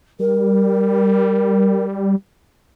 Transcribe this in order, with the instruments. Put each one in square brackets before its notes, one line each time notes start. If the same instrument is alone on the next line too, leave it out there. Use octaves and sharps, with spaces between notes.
[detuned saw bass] G3 [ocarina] A#4